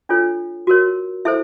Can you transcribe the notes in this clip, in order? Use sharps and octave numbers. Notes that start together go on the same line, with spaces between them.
D4 F4 A4 C#5
F#4 A#4 C#5
E4 A4 C5 E5